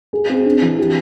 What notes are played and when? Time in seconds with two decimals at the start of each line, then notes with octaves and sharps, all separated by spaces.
0.13 G#4
0.30 C4
0.46 D4
0.62 E3
0.79 G4